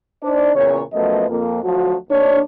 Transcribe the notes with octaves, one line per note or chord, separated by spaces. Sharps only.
D4 D#4 C5 D5
E2 A#2 C#3 C#5
F#2 F3 A3 B3 D#5
F2 A#3
D2 F3 F#3 F#4
D#2 D4 C#5